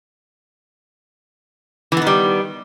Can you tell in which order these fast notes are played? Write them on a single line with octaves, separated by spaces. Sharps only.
E3 B3 D#3 G3